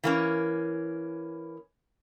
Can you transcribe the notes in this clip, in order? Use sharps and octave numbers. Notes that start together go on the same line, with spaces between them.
E3 A#3 C#4